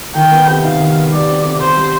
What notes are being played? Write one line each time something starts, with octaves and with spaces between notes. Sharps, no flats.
D#3 G5
B3
C3
D#4 F5
D#3
B3
G3 D5
C4
C3
C3 C5
G3